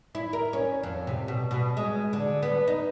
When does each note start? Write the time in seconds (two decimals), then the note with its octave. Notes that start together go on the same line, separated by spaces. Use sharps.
0.15 E4
0.33 A#4
0.53 C#4
0.83 F2
1.07 C3
1.28 B2
1.51 B2
1.77 G#3
2.13 D3
2.43 B3
2.67 D#4